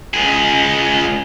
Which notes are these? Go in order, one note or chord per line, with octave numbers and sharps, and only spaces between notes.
C#2 G#4